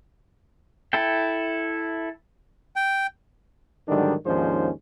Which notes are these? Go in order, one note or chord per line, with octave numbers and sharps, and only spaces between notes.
E4 A4 E5 G5
G5
G#2 D3 D#3 F#3 G3 D4
D#2 G#2 F3 C#4 D4 C5